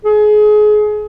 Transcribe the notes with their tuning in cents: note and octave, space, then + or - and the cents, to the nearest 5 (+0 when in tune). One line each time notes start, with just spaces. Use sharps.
G#4 +30